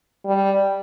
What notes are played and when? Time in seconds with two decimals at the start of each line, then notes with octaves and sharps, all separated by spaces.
0.26 G3